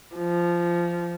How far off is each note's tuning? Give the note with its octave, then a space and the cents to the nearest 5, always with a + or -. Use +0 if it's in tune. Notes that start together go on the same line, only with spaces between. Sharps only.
F3 -15